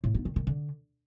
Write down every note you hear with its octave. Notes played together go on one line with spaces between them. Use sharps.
A2
B3
D#3
D#3
D3